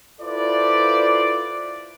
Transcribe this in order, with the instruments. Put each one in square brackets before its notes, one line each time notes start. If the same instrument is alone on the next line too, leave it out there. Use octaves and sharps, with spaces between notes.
[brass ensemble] E4 F4 A4 B4 C5 D5